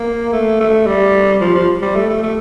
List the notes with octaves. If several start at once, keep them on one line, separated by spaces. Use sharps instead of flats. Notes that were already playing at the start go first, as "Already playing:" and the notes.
Already playing: A#3
A3
A3
G3
F3
F3
G3
A3
A3
A3